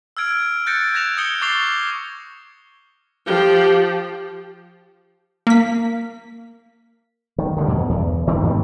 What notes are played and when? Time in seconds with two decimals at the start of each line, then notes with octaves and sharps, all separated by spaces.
0.17 E6 F6 G#6 D7
0.66 F#6 G6 A6 A#6 C#7 D7
0.94 F#6 G#6 A#6 E7 F7
1.17 D#6 G6 G#6 C#7 G7
1.42 C#6 D6 A6 C7 F7 G7
3.26 F3 G4
5.47 A#3 B6
7.38 D#3
7.57 D3 D#3 F#3 G3
7.68 E2 B2
7.89 E2
8.27 E1 D#3 F3 C4
8.43 G#2 D#3 G3 A#3